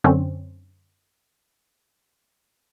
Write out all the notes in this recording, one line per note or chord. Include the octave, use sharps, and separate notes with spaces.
F#2 D3 C4 C#4